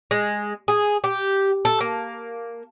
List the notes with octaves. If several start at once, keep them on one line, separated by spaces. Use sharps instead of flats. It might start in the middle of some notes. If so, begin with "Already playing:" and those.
G#3
G#4
G4
A4
A#3